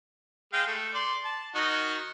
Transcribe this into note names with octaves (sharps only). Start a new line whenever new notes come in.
G#3 F5 G5
A3
D5 C6
A5
D#3 D#4 F#4